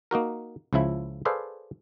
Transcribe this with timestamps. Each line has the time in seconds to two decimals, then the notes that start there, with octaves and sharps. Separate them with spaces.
0.11 A#3 D#4 F#4 A#4
0.73 C#2 C#3 F3 E4 E5
1.25 G#4 A4 B4 C5 D5 F5